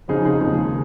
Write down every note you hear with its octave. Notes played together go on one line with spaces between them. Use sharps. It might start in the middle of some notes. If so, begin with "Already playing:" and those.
F2 C#3 F3 D#4 G#4
D#4 G#4
D#2 C#3 F3 G#3